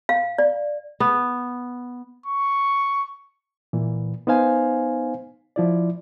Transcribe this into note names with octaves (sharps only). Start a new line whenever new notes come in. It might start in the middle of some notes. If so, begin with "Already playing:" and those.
F5
D5
B3
C#6
A#2 E3
B3 D#4 C5 F5 G#5
F3 E4 D5